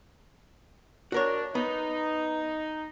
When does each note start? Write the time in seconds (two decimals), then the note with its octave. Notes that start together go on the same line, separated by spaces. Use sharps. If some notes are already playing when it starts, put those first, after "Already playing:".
1.12 D4 F#4 A#4 C#5
1.55 B3 D#4